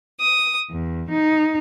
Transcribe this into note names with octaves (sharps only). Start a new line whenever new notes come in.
D#6
E2
D#4